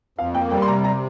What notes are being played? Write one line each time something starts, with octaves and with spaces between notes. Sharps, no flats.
F2 F5
A#3 G5
G3 G5
C6
C3 A#5
A#5